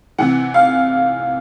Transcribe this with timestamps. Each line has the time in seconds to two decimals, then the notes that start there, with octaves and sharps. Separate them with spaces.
0.18 C3 E3 F#5
0.54 F5